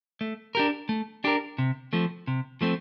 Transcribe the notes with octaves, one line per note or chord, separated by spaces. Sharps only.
A3
D4 G4 A#4
A3
D4 G4 A#4
C3
F3 A3 C4
C3
F3 A3 C4